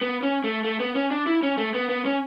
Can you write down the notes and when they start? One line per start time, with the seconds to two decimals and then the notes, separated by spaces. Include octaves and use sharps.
0.01 B3
0.23 C#4
0.44 A3
0.64 A3
0.80 B3
0.95 C#4
1.11 D4
1.27 E4
1.43 C#4
1.58 A3
1.74 B3
1.89 B3
2.05 C#4